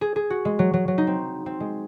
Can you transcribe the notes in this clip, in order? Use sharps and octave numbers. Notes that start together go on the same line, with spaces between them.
G#4
G#4
F#4
G#3
F#3
F#3
F#3
D#4
C4
C4
G#3